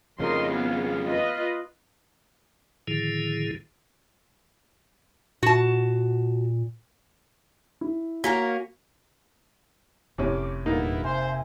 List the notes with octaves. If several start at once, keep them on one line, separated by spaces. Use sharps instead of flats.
F2 C#3 A#4 D#5 C6
B3 G#4 F5
F4 B4 D#5
A2 D3 D#3 F3 E4 G#4
A#2 F#4 A5
E4
A#3 C#4 F#4 A#4 B6
F1 A2 C3 C#4 D6
G1 E2 A#2 A#3 B3 D#4 E4
C3 C5 E5 G#5